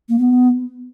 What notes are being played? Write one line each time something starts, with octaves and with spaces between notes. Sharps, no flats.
A#3
B3